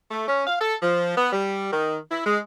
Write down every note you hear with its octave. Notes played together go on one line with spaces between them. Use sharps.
A3
C#4
F5
A4
F3
B3
G3
D#3
E4
G#3